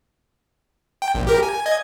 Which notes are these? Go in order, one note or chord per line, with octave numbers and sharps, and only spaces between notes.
G5
A#1
G4 A#4
G#5
D#5 G#6